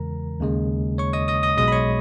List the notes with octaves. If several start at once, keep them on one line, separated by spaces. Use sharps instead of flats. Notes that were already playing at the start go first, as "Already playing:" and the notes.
Already playing: E2 C#3 E3 G#3 A#4 A#5
D#2 C#3 G#3
C#5 C#6
D#5 D#6
D#5 D#6
D#5 D#6
B1 B2 G#3 D#5 D#6
B5
C#5 C#6